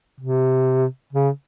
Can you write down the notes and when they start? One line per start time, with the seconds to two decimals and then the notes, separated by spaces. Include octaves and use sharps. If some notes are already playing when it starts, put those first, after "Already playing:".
0.20 C3
1.13 C#3